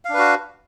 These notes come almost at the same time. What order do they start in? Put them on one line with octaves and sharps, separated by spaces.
F5 D4 B4 F#4